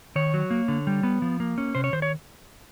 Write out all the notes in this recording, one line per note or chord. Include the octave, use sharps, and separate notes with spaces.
D#3 C#5
F#3
A#3
D3
G3
B3
F3
A#3
C#4
C3 C5
C#5
D#3 C5
C#5